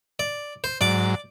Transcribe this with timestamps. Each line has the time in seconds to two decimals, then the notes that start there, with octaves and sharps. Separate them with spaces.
0.19 D5
0.64 C5
0.81 G#2 F#3 D5 D6